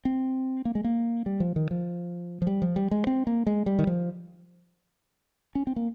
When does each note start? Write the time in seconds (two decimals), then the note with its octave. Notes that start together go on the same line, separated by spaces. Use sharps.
0.05 C4
0.65 A#3
0.75 G#3
0.84 A#3
1.26 G3
1.40 F3
1.56 D#3
1.71 F3
2.42 F3
2.47 G3
2.62 F3
2.76 G3
2.91 G#3
3.07 C4
3.27 A#3
3.47 G#3
3.66 G3
3.79 D#3
3.87 F3
5.55 C#4
5.67 C4
5.76 A#3